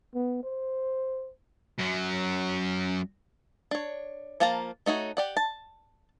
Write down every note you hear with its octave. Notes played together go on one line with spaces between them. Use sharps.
B3
C5
F#2 F#3
D4 C#5
F3 A#3 F5 A5 A#5
A3 D#4 F#4 C#5
G4 D5 F#5
A5